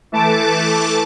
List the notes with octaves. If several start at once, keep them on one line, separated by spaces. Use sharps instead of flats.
E3 A3 A5 D6